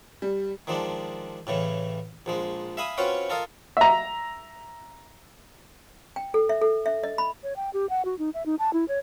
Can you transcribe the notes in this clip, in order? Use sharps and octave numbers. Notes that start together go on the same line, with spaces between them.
G3
D#3 F3 G#3 D4
A2 C#3 E3
A#1 F3 G#3
E5 F5 G#5 B5 D#6
C4 C#4 F4 F#4 B4 C#5
F4 A4 A#4 D#5 F5
E5 A#5
G5
A4
E5
A4
E5
D#5
B5
C#5
G5
G4
F#5
F#4
D#4
E5
D#4
A5
E4
C#5